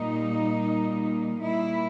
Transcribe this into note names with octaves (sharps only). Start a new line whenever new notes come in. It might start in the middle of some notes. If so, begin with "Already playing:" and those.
Already playing: A#2 G3 A#3 D#4
A#2 G3 A#3 E4